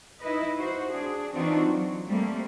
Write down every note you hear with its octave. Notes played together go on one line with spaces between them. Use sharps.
D#4 E4 B4 D#5
F#4 C5
D4 G#4
E3 C4 D4 D#4 F4 F#4
F#3
G3 A3 A#3 C4